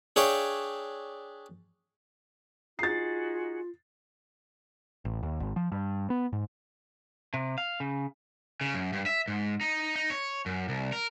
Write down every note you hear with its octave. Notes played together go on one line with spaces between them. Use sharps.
D4 G#4 C#5 E5 F5 G5
D#4 F4 F#4 G#4 A6 C7
A1
D#2
G#1
F3
G2
B3
G#2
C3
F5
C#3
C#3
F#2
G2
E5
G#2
D#4
D#4
C#5
F#2
C2
A#4